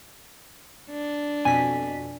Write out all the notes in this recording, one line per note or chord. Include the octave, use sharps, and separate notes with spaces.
D4
F2 B2 G#5 B6